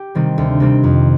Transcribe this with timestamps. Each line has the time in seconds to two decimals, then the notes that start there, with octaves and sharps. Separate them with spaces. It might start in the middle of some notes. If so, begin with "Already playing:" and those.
Already playing: G4
0.15 C3 D#3 G3 C4
0.38 D2
0.60 C3 D#3 G3 C4
0.83 F2